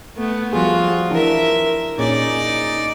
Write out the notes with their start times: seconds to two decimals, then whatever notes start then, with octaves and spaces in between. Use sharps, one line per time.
0.17 A3 B3
0.53 F3 G3 F4 F#4 G#4
1.11 E3 D4 E4 A#4 E5
1.98 A#2 C#4 D#4 G#4 D5